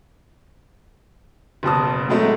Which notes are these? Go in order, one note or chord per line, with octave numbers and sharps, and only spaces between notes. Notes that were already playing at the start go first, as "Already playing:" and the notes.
F#1 B2 A5 D#6
A2 F#3 G#3 A3